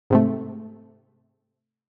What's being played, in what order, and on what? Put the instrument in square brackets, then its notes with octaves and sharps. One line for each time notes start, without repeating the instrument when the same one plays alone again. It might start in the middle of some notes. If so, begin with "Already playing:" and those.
[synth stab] G#2 C3 A3